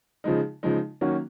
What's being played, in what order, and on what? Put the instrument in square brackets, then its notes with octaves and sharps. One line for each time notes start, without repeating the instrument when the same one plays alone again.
[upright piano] C#3 F3 G#3 D#4
C#3 F3 G#3 D#4
D#3 F#3 A#3 C#4 F#4